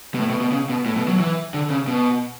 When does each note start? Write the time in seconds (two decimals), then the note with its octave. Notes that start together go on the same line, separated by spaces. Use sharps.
0.14 B2
0.19 A2
0.30 B2
0.41 B2
0.52 C#3
0.70 B2
0.86 A2
0.97 B2
1.08 F#3
1.20 E3
1.54 D3
1.70 C#3
1.87 B2